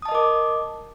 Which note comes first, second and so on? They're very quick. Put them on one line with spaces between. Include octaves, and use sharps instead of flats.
D#6 A5 D#5 A#4 D6